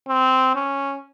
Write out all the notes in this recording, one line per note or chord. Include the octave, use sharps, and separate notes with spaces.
C4
C#4